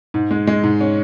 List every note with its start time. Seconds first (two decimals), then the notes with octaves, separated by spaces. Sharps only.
0.14 G#2
0.31 G#3
0.47 G#3
0.63 G#2
0.81 C#4